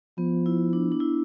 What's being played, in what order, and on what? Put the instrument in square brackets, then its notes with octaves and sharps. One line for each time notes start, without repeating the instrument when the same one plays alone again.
[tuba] F3 [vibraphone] B3
[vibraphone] E4
D4
D4
E4